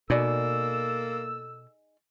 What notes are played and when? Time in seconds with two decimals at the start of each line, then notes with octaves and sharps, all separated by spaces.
0.10 B2 A#3 D#4 G#4 A4 D5 E6